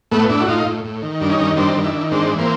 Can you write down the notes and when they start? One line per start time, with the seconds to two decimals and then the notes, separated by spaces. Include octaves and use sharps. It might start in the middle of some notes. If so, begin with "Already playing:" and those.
0.11 A2 A3 B3
0.29 A2 D4 E4
0.40 F#4
0.48 A2 D#4 F4
0.66 A2
0.84 A2
1.02 D#3
1.21 G2 D4
1.30 C#4 D#4
1.39 D#3
1.56 G2 C4 D4
1.75 D#3
1.84 D4 E4
1.93 D#3
2.11 G#2 C4 D4
2.30 E3
2.38 A#3 C4